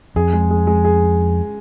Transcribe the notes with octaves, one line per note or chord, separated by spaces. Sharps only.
F2 G#4
G#3
G#3
G#3
G#4